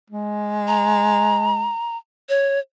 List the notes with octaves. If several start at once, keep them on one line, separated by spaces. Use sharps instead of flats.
G#3
A#5
C#5